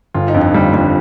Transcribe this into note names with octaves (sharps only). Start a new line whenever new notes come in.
G1 F4
D#4
F2 D3
D#4
G1 G3
F2 D3 G3